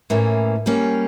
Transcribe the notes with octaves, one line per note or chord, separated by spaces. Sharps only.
A2 E3 A#3 C#4
G3 A#3 C#4